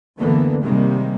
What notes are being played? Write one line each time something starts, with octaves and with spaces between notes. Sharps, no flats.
F#1 D2 D3 E3 A#3 B3
C3 D#3 G3 G#3 A#3